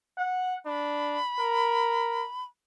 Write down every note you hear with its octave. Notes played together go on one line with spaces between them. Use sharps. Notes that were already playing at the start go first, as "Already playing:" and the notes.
F#5
D4 B5
A#4